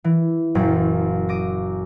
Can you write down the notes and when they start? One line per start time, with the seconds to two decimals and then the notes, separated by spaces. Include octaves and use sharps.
0.04 E3
0.55 F#1 F#2 A#2
1.29 D6 D#6 A#6